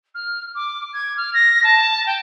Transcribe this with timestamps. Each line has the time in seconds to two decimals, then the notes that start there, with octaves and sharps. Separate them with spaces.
0.14 F6
0.54 D6
0.93 G#6
1.17 F6
1.33 A#6
1.64 A5
2.06 G5